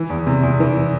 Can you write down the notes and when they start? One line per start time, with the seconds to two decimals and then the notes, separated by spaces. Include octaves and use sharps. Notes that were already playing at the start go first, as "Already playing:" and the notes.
Already playing: E3
0.10 E2
0.27 C3
0.43 E2
0.60 E3